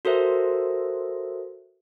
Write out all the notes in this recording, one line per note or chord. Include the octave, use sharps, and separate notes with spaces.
F#4 A4 A#4 C5 E5